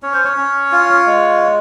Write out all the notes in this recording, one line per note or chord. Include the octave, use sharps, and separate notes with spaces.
C#4 C#5
C5
C#5
C#4
F4
G#3